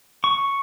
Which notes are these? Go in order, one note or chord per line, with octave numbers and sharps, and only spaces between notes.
C#6